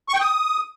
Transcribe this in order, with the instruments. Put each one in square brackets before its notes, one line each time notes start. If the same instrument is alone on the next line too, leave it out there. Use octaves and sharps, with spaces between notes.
[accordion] C#6
G5
D#6